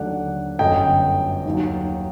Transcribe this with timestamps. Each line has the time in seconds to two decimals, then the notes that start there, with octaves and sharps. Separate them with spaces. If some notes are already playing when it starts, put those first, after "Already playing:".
Already playing: D#2 D3 F#3 A3 D5 F#5
0.59 G1 F#2 F#3 A3 D#5 G5
1.45 D#2 D#3 F#3